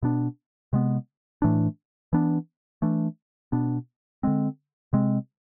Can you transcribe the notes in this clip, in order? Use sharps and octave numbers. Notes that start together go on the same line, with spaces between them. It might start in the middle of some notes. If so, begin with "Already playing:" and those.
B2 B3 D4
C3 G#3 B3
A2 E3 A3 D4
E3 B3 D4
E3 A3 D4
B2 B3 D4
D3 G#3 C4
C3 G#3 C4